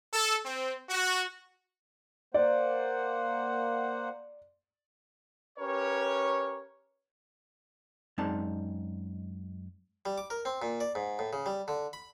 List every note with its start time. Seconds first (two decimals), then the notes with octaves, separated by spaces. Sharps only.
0.14 A4
0.46 C4
0.90 F#4
2.34 A#3 C5 D5 F#5
5.59 C#4 G4 A#4 B4 C#5
8.18 F#2 G#3 C4 D#4 D5 A5
10.06 G3
10.18 D6
10.30 A#4
10.45 C4
10.62 A#2
10.80 D5
10.95 G#2
11.19 A2
11.33 C#3
11.46 G3
11.68 D3
11.93 B5